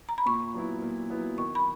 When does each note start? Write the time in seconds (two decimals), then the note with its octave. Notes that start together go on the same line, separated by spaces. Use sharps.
0.09 A#5
0.18 B5
0.26 A#2 C#6
0.54 F#3 B3 E4
0.82 A#2
1.10 F#3 B3 E4
1.38 D#3 C#6
1.55 B5